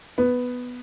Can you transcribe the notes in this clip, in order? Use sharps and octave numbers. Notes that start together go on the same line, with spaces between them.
B3